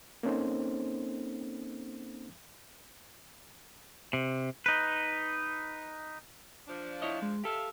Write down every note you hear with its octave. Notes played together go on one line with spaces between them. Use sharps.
A#3 C4 C#4 D#4 A4 C5
C3
D#4 B4
F3 D4
E4 C#5 D#5
G#3
G4 A4 E5 F5